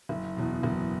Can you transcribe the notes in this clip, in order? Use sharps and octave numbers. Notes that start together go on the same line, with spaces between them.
F#1
E2 B2
F#1